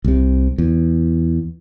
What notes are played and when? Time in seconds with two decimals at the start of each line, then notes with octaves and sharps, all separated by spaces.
0.04 C2 C3
0.58 E2